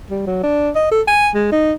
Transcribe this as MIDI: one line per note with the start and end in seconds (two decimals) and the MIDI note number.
0.10 0.26 55
0.27 0.44 54
0.44 0.70 62
0.75 0.89 75
0.91 1.02 69
1.08 1.29 80
1.35 1.50 56
1.52 1.73 63